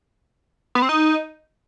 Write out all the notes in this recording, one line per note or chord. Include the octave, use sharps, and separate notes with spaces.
B3
C4
D#4